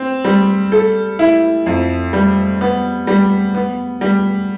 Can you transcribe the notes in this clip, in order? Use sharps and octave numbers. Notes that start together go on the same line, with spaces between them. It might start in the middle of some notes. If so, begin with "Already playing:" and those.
Already playing: C4
G3
A4
E4
F2
G3
B3
G3
B3
G3